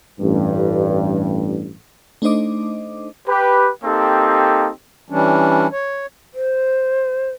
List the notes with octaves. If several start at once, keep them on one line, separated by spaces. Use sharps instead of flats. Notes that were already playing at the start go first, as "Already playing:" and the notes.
A1 G2
A3 D4 D#4 C5 D#5 D6
G4 B4
A#3 C4 D#4 G4 A4
E3 G3 C#4 D4
C#5
C5